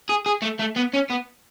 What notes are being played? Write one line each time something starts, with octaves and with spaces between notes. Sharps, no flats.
G#4
G#4
A3
A3
B3
C#4
B3